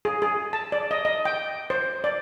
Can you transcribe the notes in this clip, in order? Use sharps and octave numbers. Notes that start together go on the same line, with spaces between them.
G#4
G#4
A5
D5
D#5
D#5
G5
C5
D5